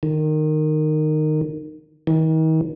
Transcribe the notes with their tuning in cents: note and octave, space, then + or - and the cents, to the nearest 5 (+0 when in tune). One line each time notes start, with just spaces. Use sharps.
D#3 -15
D#3 +40